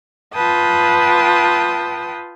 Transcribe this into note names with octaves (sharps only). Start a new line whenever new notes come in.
F4 B4 G5 A5 D#6